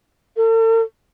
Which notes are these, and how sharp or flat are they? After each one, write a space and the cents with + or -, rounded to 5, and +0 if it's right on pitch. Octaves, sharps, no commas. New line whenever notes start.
A4 +45